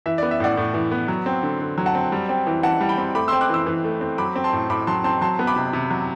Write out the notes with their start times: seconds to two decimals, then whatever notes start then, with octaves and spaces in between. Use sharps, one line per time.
0.06 E3 E5
0.18 D5
0.22 B3
0.31 E5
0.40 A2 D5 F#5
0.57 A2
0.74 E3
0.92 B3
1.08 F#3
1.26 C4
1.43 D3
1.60 D3
1.78 F#3
1.86 F#5 A5
1.95 C4
2.12 G3
2.29 C4
2.47 E3
2.63 E3 F#5 A5
2.81 G3
2.89 G5 B5
2.98 C4
3.15 A3 B5 D6
3.28 C4 C6 E6
3.41 D6 F#6
3.49 E3 C6 E6
3.66 E3
3.84 A3
4.01 C4
4.18 F#3 B5 D6
4.36 C4
4.44 A5 C6
4.53 A2
4.70 A2 B5 D6
4.87 F#3 A5 C6
5.04 C4 A5 C6
5.21 F#3 A5 C6
5.39 B3
5.47 B5 D6
5.56 C3
5.73 C3
5.90 F#3